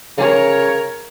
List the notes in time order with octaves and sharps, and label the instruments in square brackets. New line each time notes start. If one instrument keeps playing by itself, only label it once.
[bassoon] C#3 [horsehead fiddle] A#4 C#5